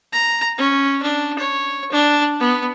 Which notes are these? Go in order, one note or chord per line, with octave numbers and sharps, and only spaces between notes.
A#5
C#4
D4
C#5
D4
B3